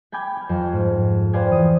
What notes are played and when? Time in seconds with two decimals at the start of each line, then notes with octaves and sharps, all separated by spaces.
0.12 G5 G#5 B5 D6 G6 G#6
0.36 G5 F6
0.49 F2
0.73 G#2
1.33 B4 C5 D5 F5 G5 G#5
1.51 E3 D#6